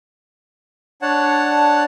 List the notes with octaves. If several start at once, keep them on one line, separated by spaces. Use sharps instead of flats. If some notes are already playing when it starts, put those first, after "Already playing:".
D4 C#5 F#5 A5